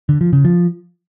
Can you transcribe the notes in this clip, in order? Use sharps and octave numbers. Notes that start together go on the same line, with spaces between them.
D3
F3
C#3
F3